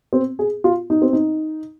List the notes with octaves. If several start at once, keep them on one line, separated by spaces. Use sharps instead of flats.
C4
G#4
F4
D#4
C4
D#4